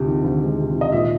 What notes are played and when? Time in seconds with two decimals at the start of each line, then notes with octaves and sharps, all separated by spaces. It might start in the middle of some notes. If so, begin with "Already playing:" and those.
Already playing: D2 C3 G#3
0.08 D#3
0.24 D2
0.42 G#3
0.59 C3
0.75 D#3
0.81 D#5
0.92 A#2 E5